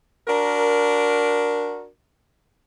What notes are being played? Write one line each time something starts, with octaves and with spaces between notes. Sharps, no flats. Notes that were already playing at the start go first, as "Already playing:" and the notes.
D4 F#4 A#4